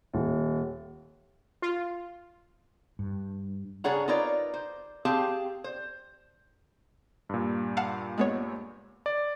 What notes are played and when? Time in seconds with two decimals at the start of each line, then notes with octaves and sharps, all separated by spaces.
0.13 D#1
1.62 F4
2.99 G2
3.84 C#3 D4 G#4 C#5 F#5 A#5
4.08 D#4 F4 A#4 B4 C#5 D5
4.54 C5
5.05 C4 G4 G#4 F5 A5
5.64 C5
7.29 G2 A#2
7.77 F5 F#5 A5
8.18 G#3 B3 C#5
9.06 D5